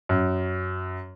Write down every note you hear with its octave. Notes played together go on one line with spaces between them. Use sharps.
F#2